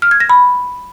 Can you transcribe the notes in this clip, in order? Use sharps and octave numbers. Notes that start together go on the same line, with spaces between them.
F6
G#6
A#6
B5